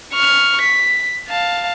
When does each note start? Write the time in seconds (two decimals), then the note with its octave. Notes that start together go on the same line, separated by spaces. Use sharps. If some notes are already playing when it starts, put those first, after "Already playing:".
0.13 C#6 F6
0.61 B6
1.28 F5 A5